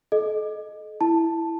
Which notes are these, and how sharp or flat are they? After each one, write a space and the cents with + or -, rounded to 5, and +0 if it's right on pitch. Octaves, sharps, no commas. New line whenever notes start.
A4 -40 D#5 -5
E4 +0 A5 +0